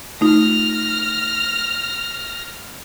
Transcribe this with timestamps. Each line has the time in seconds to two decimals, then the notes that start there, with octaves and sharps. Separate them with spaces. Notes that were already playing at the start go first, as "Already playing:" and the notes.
0.21 A3 D#4 F4 F6 A#6